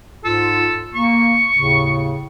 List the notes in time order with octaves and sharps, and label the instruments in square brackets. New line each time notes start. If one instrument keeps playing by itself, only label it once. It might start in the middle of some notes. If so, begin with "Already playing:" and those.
[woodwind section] G#2 F4 [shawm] A4
[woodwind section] A#3 [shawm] C#6
[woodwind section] D#2 A2 C#3